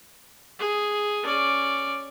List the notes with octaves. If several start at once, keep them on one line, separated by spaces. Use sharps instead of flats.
G#4
C#4 D5